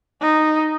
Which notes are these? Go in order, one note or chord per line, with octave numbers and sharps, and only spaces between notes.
D#4